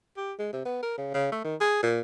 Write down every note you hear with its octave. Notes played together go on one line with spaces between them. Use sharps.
G4
G#3
C3
B3
A#4
C#3
C#3
A3
D#3
G#4
A#2